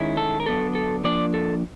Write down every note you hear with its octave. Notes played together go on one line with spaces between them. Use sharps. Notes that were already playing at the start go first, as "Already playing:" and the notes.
Already playing: D#3 G#3 C#4 E4
A4
A#4
D3 F#3 B3 D4 A4
A4
F3 A#3 D4 D5
A4